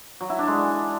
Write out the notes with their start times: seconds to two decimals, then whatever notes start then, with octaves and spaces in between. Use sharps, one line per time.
0.21 F#3
0.30 E4
0.39 D4
0.48 G#3